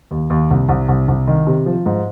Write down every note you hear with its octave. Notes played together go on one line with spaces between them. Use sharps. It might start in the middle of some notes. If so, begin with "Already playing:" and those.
D#2
D#2
C2
C2
C2
C2
D#3
C3
F3
G#2